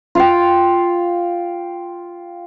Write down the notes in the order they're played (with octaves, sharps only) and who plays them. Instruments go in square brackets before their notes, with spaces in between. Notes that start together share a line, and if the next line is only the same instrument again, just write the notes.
[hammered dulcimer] F4 F5 G5